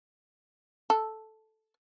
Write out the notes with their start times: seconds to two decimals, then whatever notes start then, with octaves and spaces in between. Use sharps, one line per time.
0.90 A4